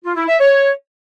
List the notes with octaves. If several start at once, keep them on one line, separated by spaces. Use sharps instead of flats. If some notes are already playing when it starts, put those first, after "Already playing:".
F4
E4
E5
C#5